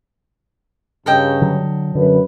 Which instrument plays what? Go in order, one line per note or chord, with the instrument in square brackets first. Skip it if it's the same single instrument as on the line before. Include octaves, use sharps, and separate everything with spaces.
[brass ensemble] G2 C#3 [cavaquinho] A4 D#5 G5
[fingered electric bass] D3 F#3
[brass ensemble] F#2 B4 [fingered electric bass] D3